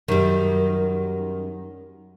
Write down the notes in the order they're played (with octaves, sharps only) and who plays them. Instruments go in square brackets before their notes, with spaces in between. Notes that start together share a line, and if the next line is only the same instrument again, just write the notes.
[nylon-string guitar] F#2 [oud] D#3 G3